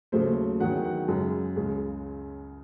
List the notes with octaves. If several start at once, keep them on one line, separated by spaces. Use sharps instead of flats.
D#2 C#3 F#3 A3 C5
E2 D#3 F#3 F#5
F#5
F#2 C#3 G#3
C#2 C#3 G#3